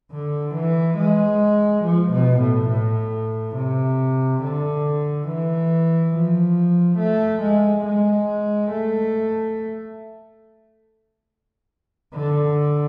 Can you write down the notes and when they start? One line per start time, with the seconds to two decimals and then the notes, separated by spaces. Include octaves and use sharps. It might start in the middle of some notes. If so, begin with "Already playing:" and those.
0.12 D3
0.55 E3
0.98 G#3
1.84 F3
2.12 B2
2.41 A2
2.70 A2
3.56 C3
4.42 D3
5.28 E3
6.13 F3
6.99 A3
7.42 G#3
7.85 G#3
8.71 A3
12.14 D3